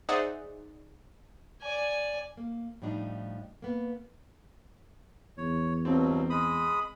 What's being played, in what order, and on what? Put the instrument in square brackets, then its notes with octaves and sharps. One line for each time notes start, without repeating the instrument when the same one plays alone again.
[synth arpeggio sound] D#4 G#4 C5 D5 E5 F#5
[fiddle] D5 G#5
[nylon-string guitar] A#3
A2 F3 G3 D4 D#4
A#3 B3
[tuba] E2 [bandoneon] C#5
[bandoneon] G2 B2 F#3 [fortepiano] C4
[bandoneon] G#3 B5 D#6